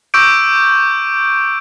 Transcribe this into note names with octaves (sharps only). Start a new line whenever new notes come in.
C#6 D6 E6 G6 D7